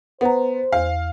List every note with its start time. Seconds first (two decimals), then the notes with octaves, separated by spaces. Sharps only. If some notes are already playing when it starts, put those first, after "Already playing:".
0.21 B3 C5 F#5 A#5
0.72 E2 F5